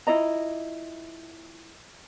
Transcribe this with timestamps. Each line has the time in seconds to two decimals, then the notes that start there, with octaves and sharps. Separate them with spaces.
0.07 E4 F4 D#5 A#5